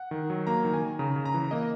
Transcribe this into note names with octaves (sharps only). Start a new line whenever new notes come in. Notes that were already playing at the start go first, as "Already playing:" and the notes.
Already playing: F#5
D#3
F#3
A#3 A#5
D#3
G#5
D#3
C#3 A#5
C#3
A#5
E3
A#3 D#5